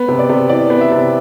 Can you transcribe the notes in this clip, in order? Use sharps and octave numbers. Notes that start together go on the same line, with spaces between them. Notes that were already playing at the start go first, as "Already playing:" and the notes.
Already playing: B3
C3
D5
C3
E3 D5
B3
E5
C3